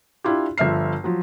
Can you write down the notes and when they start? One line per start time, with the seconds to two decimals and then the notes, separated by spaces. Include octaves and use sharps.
0.24 D4 E4 F4 G4
0.58 G1 F3 E5 F6 C7
1.04 F3 F#3